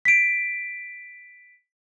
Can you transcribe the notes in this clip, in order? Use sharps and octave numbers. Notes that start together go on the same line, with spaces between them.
B6 D7